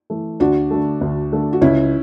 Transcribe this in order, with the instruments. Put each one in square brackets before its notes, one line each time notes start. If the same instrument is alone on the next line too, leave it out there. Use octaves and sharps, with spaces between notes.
[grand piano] E3 A3
[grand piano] D2 [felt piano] D4 F#4
[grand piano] D3 A3
D2
D3 A3
[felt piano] F#4
[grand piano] C#2 [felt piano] C#4 E4